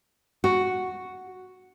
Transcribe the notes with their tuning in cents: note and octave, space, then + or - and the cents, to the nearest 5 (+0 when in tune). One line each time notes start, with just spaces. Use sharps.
F#4 +0